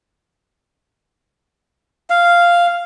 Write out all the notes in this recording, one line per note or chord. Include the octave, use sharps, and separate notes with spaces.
F5